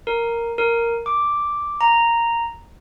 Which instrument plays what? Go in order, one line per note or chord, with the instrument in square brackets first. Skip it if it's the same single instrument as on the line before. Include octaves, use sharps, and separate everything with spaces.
[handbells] A#4
A#4
D6
A#5